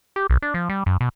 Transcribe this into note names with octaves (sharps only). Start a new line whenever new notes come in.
G4
B1
D4
F3
G3
F#2
B2